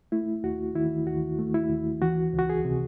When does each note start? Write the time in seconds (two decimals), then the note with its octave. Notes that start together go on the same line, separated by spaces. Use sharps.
0.12 A3 E4
0.44 D#2 F#4
0.75 D#3 E4
1.07 D#2 F#4
1.39 A3
1.54 E4
1.70 D#2
2.02 E3 F#4
2.33 C#2
2.39 F#4
2.50 G#4
2.65 C3